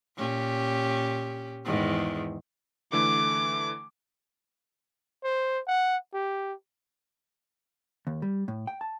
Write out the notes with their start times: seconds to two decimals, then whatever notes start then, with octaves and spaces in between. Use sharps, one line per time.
0.16 A#2 C#4 G4
1.65 E2 G#2 D#3
2.93 D3 E3 A3 D6
5.24 C5
5.68 F#5
6.14 G4
8.07 D#2
8.22 G3
8.48 A2
8.67 G5
8.81 A5